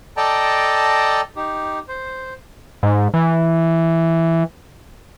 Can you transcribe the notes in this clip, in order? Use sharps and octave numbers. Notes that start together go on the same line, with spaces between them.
A4 D5 D#5 G5 A5 A#5
D#4 G4
C5
G#2
E3